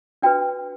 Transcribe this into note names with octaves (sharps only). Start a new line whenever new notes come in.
D4 F#4 B4 G5